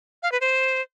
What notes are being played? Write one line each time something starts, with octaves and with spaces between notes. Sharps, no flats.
F5
B4
C5